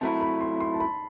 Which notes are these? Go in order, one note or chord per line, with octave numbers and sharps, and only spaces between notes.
C3 F#3 A3 E4 A5
B5
C6
C6
A5
B5